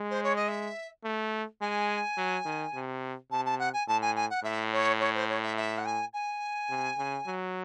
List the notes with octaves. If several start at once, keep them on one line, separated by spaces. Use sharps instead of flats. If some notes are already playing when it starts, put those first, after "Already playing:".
Already playing: G#3
C5
C#5
D#5
E5
A3
G#3 G#5
F#3
D#3
C3
C3 A5
A5
F#5
G#5
A2 A5
G#5
G#5
F#5
A2 E5
C#5
C#5
C5
C#5
E5
E5
F#5
G#5
G#5
C3
C#3
F#3